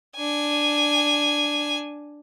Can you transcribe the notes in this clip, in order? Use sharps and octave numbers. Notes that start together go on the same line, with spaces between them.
D4 G#5